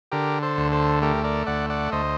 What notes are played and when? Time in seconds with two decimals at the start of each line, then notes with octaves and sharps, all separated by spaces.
0.12 D3 G4 A#4
0.43 A4 C5
0.57 D2
0.72 A4 C5
1.02 A3 G4 A#4
1.24 A#4 D5
1.46 D2 D5 F#5
1.70 D5 F#5
1.92 D2 C5 D#5